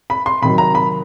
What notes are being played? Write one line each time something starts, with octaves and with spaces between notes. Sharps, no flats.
B5
C6
C3 D#3 F#3 B5
A#5
B5